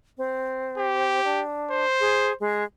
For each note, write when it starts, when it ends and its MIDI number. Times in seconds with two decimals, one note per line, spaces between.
0.18 1.23 60
0.77 1.42 67
1.24 1.85 62
1.70 2.33 72
2.00 2.33 68
2.40 2.64 56